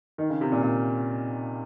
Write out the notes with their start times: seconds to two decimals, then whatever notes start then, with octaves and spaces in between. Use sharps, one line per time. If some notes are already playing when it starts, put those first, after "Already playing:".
0.18 D#3
0.30 C#3
0.41 C3
0.52 A#2
0.63 A#2